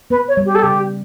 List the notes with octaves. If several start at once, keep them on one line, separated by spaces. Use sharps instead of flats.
B3 B4
C#5
G3
G4
A4
C#3 G4